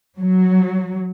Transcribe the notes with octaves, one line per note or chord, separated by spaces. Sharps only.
F#3